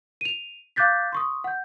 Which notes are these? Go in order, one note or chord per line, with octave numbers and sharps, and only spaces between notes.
D#7 F7
F5 D6 F#6 G6 A6 B6
C6 C#6 D#6
F#5 G6